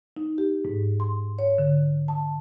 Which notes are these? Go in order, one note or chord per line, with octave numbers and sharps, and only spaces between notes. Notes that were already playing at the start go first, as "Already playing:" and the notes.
D#4
G4
G#2
C6
C#5
D3
A5